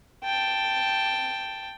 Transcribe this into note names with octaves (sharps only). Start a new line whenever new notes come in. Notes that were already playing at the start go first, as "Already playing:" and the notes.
G5 A5